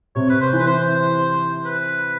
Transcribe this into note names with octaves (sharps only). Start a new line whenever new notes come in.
C3 C#5
B4
C5
E3
B4
C5
B4